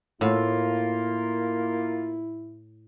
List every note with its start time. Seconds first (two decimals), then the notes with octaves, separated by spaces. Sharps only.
0.21 A2 A#3 E4 F4